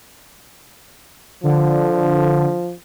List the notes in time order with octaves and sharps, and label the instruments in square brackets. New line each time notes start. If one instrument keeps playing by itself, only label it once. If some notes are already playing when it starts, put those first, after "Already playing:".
[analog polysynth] D3 [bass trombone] F3